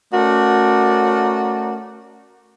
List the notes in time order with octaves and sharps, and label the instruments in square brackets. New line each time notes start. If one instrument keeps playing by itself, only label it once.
[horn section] A3 C#4 F#4 A#4 D5